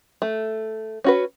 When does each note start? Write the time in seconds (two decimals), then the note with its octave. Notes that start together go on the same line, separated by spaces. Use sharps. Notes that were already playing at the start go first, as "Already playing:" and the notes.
0.22 A3
1.04 C#4 F#4 B4